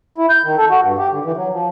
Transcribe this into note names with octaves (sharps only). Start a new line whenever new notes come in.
E4
G6
D#3
A4
F#4
G2
G4
D3
E3
F#3
F3